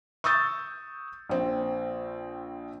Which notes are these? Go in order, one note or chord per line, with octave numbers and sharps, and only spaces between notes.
C#6 D#6 E6 G6 A6
A#1 C4